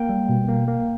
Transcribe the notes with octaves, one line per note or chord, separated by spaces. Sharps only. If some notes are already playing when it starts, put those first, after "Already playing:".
Already playing: A#3 G5
G3
B2
A#3
A#3